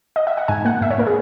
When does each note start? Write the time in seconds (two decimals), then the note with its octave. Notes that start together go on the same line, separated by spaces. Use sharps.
0.16 D#5
0.27 E5
0.37 F#5
0.48 G#2 G#5
0.65 A#3 F#5
0.81 G#2 E5
0.91 C#5
0.98 A#3 A#4
1.07 G#4